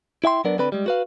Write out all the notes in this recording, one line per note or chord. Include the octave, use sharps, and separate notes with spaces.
E4 E5 G5 C6
F#3 B3 D4 A#4 D5
D3 C4 B4 D5 B5
G3 G#3
F#4 B4 F5